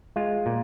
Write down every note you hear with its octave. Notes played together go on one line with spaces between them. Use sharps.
G#3 F4
A#2